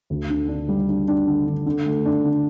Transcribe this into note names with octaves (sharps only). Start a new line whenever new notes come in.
D2
D3
D4
G3
D4
D4
D3
D3
D3
A3
D4
D3